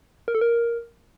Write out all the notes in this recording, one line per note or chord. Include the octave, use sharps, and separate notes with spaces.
A#4
A4
A#4